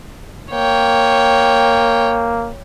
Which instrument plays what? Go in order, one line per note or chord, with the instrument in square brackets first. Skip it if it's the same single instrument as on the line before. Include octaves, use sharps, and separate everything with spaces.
[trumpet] A#3 [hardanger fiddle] C#5 G5